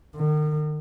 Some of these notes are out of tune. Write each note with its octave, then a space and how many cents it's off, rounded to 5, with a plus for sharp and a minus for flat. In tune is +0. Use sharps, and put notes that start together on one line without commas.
D#3 -40